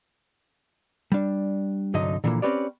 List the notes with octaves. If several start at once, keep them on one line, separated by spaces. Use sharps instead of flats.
G3 D4
C2 G2 D3 F#3 D#4 D#5
A#2 D3 E3 F3 G#3 A#3
C4 C#4 G4 B4 C#5 D5